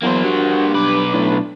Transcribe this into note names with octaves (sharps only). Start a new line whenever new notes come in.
E2 F#3 A#3 C5
G2 F#4
B1 B4 D6
A2 D4